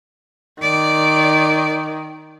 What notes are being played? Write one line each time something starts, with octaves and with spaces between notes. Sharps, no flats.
D#3 D5